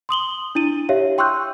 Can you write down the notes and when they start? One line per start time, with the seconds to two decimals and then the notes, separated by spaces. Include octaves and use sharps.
0.09 C6 D#6 F#7 G7
0.55 D4 E4 D#7
0.89 G4 C#5 E5 F5
1.18 G5 C6 C#6 E6 F#6 G6